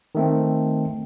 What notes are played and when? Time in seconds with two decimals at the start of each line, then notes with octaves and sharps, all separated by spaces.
0.15 D#3 A3 C4